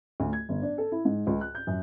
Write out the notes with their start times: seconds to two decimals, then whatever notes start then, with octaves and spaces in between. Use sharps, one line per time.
0.20 D2
0.33 G#6
0.49 G1
0.62 D4
0.78 A4
0.92 E4
1.05 G#2
1.27 C#2
1.41 F#6
1.55 G6
1.67 F#2